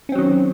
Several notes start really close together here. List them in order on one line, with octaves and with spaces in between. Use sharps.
C#4 C4 F#3 D#3